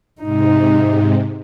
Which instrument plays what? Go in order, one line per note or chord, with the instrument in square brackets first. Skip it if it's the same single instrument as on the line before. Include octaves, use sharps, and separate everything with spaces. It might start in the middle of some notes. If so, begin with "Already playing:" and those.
[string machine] G#2 C3 [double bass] D#4